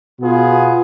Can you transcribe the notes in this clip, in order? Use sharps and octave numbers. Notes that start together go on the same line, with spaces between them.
B2 B3 F4 G#4